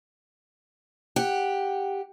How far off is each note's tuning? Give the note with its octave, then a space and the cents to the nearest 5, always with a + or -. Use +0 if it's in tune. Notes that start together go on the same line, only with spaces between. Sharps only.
G4 +5 F#5 +0